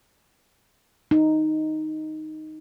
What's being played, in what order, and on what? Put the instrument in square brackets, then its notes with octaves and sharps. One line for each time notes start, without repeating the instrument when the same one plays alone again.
[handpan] D#4